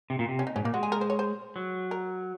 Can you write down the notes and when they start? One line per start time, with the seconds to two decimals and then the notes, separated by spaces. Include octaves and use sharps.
0.10 C3
0.19 A#2
0.29 C3
0.39 C#4
0.47 D#4
0.56 G#2 C#4
0.64 A#2 A#3
0.74 G#3 F#4
0.83 G#4
0.92 A#4
1.01 C5
1.10 C#5
1.19 C5
1.56 F#3
1.91 A#4